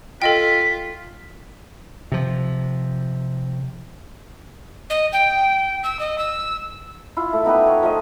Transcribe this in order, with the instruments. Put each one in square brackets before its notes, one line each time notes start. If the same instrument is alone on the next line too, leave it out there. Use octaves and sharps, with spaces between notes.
[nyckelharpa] F4 [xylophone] A4 D#5 G5 [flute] B6
[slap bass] C3 F3
[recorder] D#5
G5
E6
D#5
E6
[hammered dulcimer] E4 F4 E5 F5
A3
B3 D#4 G4 B4
C#5 F5
F3 A3 D#5